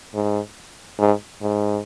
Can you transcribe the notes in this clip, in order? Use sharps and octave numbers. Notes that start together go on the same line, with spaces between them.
G#2
G#2
G#2